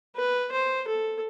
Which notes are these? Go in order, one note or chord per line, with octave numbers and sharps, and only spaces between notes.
B4
C5
A4